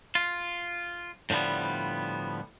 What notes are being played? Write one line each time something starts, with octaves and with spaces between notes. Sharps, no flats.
F4
A2 D3 F3 G3 B3